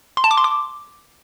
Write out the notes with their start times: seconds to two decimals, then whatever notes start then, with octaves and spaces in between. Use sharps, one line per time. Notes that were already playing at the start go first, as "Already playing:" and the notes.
0.17 C6
0.24 A5
0.31 D6
0.38 C6
0.44 D6